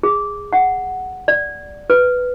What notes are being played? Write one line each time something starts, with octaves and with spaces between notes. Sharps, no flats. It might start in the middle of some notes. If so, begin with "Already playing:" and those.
G#4
F#5
D5
B4